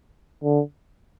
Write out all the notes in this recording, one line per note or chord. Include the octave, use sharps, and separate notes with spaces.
D3